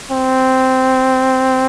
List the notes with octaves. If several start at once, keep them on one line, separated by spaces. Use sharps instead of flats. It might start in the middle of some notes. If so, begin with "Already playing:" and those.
C4